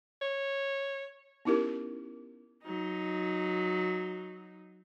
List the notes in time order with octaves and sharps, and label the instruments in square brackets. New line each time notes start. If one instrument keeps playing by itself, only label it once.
[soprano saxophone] C#5
[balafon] B3 C#4 D#4 E4 G4 A#4
[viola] F#3 D#4